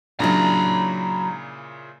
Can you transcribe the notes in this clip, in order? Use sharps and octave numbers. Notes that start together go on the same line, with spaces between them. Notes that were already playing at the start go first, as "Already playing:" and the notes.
A#2 C#3 F#3 D4 E4 A#5 B5